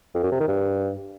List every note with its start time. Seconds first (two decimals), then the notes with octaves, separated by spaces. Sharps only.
0.15 F2
0.23 F#2
0.31 C3
0.40 D#3
0.48 G2